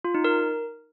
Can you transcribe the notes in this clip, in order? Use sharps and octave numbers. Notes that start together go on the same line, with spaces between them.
F4
D#4
A#4